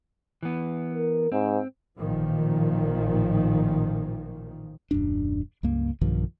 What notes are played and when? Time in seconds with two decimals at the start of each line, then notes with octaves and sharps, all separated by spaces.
0.43 E3 B3
0.93 A#4
1.32 G#2 C4
1.98 A1 A#2 D#3 F3
4.91 D#1 F#2 D4
5.63 C#2 G2 A#3
6.01 B1 G2 D#3 F3